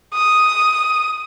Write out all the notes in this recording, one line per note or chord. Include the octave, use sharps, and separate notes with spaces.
D#6